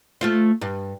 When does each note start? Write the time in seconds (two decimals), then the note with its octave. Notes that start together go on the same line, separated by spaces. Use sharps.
0.21 A3 F4 C5
0.61 G2